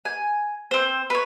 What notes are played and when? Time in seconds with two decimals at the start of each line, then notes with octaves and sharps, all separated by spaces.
0.05 G#5
0.71 C4 C5
1.10 B4 C#5